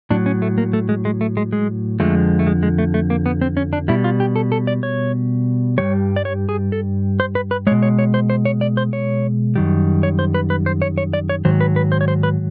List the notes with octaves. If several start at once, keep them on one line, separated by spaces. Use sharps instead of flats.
A2 F#3 D4
C#4
A3
A#3
A3
G#3
G#3
A3
G#3
G#3
F2 D3 F3 G#3 A3
A3
G#3
G#3
A3
A3
A#3
B3
C4
C#4
D4
B2 G3 E4
F4
G4
A4
A4
D5
C#5
G2 E3 G3 C#5
D5
C#5
G#4
A4
C5
B4
B4
B2 G#3 C#5
C#5
C#5
C5
C5
C#5
D5
C5
C#5
F#2 D#3 G3
C#5
C5
B4
B4
C5
C#5
C#5
D5
C#5
G#2 D#3 F#3 C5
B4
B4
C5
C#5
C5
B4